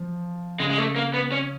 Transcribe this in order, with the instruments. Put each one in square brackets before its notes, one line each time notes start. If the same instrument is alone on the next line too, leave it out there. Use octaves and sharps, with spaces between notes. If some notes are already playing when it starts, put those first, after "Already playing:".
Already playing: [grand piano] F3
[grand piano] C#3 [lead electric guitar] G#3
[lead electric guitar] G#3
A3
A#3
B3
C#4